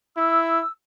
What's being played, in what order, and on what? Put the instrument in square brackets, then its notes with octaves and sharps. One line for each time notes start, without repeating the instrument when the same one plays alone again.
[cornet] E4 [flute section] E6